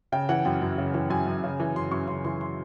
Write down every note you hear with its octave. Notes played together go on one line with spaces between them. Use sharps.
C#3 G5
E3 F#5
F#2 G5
F#2
C#3
E3
F#2 G#5
F#2
C#3
E3
F#2 C6
F#2 C#6
C#3 C6
E3 C6
C6